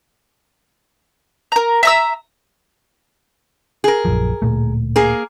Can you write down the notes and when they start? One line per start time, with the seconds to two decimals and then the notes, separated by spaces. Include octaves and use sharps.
1.52 A#4 A#5
1.83 E5 A#5 E6
3.84 G#4 A#4
4.05 A#1 F#2 F3
4.42 D1 A#2 A3
4.96 A#3 G#4 A#4